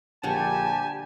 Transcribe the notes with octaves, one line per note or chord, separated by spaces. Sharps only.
A#1 D3 G3 G4 G#5 A5 C#6